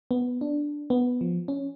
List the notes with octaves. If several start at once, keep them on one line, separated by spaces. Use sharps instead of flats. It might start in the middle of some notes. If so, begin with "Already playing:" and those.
B3
D4
B3
F3
C#4